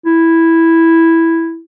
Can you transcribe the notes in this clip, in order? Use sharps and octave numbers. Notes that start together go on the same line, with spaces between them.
E4